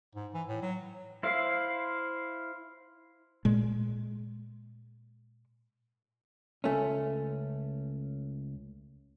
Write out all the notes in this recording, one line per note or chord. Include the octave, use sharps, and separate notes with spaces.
G#2
E3
A2
F#3
E4 C5 F5
A#2 G#3
C#2 A3 C#4